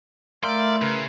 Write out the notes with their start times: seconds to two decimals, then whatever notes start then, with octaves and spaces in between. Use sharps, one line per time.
0.43 A3 E4 A#4 D5 E5 F5 G5 C6
0.82 C#3 A#4 B4